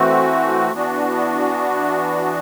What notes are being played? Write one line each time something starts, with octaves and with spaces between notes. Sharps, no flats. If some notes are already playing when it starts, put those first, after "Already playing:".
Already playing: E3 A3 C4 F#4
E3 B3 D4 F#4